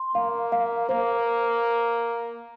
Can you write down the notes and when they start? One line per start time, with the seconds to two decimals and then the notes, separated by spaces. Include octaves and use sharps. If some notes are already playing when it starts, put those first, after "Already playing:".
Already playing: C6
0.15 A#3 F5
0.52 F5
0.89 A#3 C5